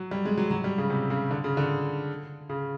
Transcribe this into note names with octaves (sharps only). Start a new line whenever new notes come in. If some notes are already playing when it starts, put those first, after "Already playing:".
Already playing: F#3
G3
G#3
F#3
F#3
G3
C#3
C3
C#3
D3
C#3
D3
C#3